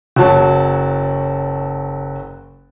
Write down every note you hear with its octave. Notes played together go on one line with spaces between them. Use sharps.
F#1 F#3 F#4 C#5 A5